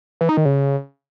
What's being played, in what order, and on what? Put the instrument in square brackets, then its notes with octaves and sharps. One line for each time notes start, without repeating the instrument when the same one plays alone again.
[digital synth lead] E3
D#4
D#3
C#3